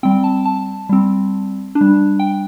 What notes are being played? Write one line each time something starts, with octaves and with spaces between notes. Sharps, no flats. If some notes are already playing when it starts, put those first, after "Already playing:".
G3 C4 G5
A5
A5
G3 C4
D4
G3
G5